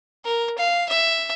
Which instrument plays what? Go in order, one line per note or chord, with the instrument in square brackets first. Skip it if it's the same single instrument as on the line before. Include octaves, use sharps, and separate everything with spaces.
[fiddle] A#4
F5
E5